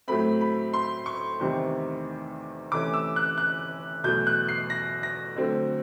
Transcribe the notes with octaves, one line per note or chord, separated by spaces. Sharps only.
A2 F#3 A3 C4 B5
B5
C6
C#6
E2 C3 D#3 G3 C4
C3 E3 A3 C#4 D6
E6
F#6
F#6
E2 B2 F#3 A3 G6
F#6
C7
A#6
A#6
D3 F#3 A3 C4